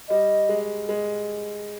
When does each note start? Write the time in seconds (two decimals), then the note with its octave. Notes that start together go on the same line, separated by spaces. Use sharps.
0.09 G3 D#5
0.49 G#3
0.89 G#3